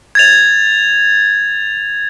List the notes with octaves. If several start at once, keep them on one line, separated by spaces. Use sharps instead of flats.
G#6 A6 F7